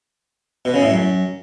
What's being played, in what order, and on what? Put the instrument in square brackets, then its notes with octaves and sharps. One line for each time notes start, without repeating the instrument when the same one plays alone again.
[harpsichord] B2
C#3
A2
F#2